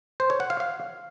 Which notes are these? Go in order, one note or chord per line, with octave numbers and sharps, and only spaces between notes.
C5
C#5
F#5
F5
F5